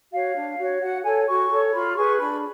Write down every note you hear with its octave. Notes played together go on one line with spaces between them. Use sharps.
F#4 C#5 F5
D4
F#4 C#5
F#4 F#5
A4 C#5 G#5
F#4 C#6
A4 C#5
F4 B5
G#4 B4 C#6
D4 B5